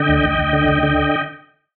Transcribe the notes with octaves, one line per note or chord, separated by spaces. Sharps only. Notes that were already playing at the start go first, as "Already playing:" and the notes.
Already playing: D3 D#5 G5
D2
D2
D2
D3
D2
D3